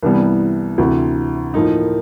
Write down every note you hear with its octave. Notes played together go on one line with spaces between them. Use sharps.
C2 C3 E3 G3 B3
D2 C3 E3
A2 F3 A#3 D#4